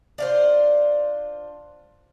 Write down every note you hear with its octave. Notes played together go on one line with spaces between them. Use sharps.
D4 F4 C5